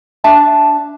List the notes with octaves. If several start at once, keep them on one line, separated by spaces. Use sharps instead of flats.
D4 E5 A5